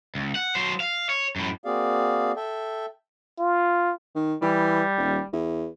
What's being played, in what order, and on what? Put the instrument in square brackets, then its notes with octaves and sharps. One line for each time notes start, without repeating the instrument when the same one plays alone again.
[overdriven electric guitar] C#2
F#5
F#3 C5
F5
C#5
F#2 A2
[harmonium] A#3 C4 F#4 G#4 D5 F5
A4 E5 G5
[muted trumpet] F4
[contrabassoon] D#3
[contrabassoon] E3 [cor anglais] G3
[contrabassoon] D#1
E2